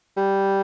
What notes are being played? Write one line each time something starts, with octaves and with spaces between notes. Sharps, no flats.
G3